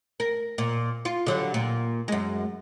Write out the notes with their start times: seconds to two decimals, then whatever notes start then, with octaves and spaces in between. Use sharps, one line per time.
0.20 A#4
0.58 A#2
1.05 F4
1.26 D3 F#3 G3
1.54 A#2
2.08 F#2 G#3